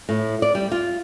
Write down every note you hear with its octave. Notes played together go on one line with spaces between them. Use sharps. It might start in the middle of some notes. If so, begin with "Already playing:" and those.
A2
D5
G3
F4